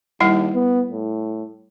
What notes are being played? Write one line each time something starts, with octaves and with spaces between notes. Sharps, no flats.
D#2 G3 E4 F#5
B3
A2